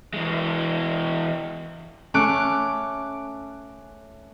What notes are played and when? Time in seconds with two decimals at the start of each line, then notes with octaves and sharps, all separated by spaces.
0.14 E3 G#3
2.14 A3 C#4 D6 F#6 D7